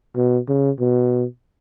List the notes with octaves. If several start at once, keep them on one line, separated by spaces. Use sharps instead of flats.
B2
C#3
B2